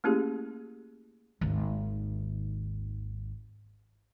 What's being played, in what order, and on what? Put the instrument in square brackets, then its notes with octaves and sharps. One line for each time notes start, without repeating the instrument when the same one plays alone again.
[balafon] A3 A#3 C#4 E4 G4 G#4
[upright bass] G#1 D#2